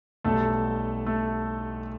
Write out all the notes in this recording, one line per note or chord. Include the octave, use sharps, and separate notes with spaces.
B1 B2 G3 A3 A4
A3 A4